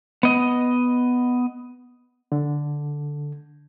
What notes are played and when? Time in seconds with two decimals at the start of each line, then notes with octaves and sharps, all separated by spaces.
0.23 B3 D#5
2.32 D3